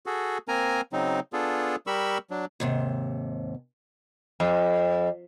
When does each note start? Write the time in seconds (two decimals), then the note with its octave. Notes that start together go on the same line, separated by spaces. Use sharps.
0.06 F#4 G#4 A4
0.48 A#3 C4 A#4 G#5 A#5
0.93 C#3 F#3 C4 D#4
1.33 B3 D4 F4 G#4 A4
1.87 G3 G4 A#4 B5 C#6 E6
2.31 F#3 D4
2.60 D#2 G#2 C3
4.40 F2